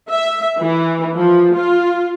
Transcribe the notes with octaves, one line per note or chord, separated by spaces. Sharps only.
E5
E3
F3
F4